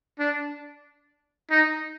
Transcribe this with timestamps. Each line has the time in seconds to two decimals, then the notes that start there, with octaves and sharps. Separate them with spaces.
0.19 D4
1.51 D#4